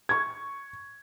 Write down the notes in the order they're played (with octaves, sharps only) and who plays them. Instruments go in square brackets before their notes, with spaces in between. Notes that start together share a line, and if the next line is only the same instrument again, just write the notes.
[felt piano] C#6 G#6